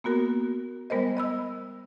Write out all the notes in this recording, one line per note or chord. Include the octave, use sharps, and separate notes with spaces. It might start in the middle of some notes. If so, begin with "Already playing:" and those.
A#3 B3 F#4 A#4
G3 G#3 B3 A#4 C5 D#5
D#5 B5 E6